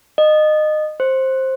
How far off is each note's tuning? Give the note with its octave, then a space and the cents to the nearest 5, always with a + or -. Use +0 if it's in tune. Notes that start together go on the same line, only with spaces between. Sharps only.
D#5 -20
C5 +10